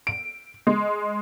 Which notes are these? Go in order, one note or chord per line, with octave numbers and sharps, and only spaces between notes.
D7
G#3